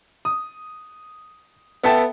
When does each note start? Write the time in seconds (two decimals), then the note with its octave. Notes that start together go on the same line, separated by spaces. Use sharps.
0.25 D#6
1.83 B3 A4 E5 G5 A5